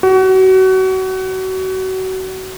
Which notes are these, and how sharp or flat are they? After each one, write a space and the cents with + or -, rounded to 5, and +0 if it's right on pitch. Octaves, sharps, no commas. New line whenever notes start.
F#4 +30